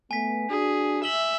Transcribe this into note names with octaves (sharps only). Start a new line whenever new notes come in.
A3 B3 G#5 B6
D4 F#4 G#4
E5 F#7 G7